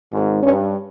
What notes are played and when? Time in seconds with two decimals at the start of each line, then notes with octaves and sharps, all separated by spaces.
0.12 G#1 G#2
0.42 G2 C#4